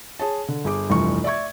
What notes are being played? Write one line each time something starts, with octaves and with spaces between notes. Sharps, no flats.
G#4 C#5 A5
D3
G1 G#4 D6
F1 C2 G2 E3 F4 C#6
D5 E5 C#6 G#6